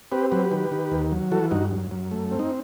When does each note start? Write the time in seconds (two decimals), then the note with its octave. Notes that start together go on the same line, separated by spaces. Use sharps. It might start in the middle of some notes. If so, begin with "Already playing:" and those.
0.12 C4 G4 B4
0.32 F#3 G4 B4
0.51 D#3
0.72 D#3
0.91 D#2
1.12 F#3
1.32 E3 F#4 A4
1.51 G2 D#4 F#4
1.72 F#2
1.91 F#2
2.11 A3
2.32 C4
2.39 D#4